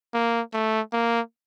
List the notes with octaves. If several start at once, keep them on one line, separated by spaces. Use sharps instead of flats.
A#3
A3
A#3